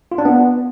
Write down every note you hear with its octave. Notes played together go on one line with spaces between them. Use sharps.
F4
D4
B3